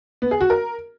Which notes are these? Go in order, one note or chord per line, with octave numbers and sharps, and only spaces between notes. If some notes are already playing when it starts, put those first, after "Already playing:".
B3
G#4
F#4
A#4